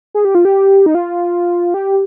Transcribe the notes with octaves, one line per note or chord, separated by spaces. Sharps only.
G#4
G4
F4
G4
D#4
F4
G4